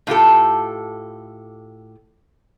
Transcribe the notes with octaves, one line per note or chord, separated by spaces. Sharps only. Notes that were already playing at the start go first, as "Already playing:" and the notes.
A2 F4 G4 A4